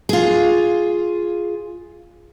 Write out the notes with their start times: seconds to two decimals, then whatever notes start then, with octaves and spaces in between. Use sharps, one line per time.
0.09 F4 G#4